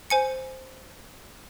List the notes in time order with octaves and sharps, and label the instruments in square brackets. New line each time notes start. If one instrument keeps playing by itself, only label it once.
[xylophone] C5 G#5 C#7